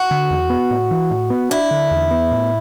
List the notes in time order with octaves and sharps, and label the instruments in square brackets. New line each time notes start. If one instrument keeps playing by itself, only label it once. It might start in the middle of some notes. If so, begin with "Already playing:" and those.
Already playing: [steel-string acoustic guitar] F#4
[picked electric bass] D3
E2
B3
A2
E3
A2
B3
[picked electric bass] D4 [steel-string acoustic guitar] E4
[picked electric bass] D3
E2
B3
A2